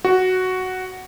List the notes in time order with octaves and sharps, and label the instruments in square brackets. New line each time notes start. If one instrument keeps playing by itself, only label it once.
[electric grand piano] F#4